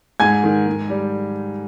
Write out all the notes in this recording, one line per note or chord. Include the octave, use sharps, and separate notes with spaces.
G#2 G#5 G#6
D#3
G#2
G3